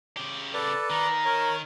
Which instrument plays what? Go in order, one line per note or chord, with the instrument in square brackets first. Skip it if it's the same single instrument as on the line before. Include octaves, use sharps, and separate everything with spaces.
[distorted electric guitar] C#3 G4
[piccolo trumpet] A4 [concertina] B4 D5
[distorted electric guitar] D#3 [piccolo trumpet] A#5
[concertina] A#4 C#5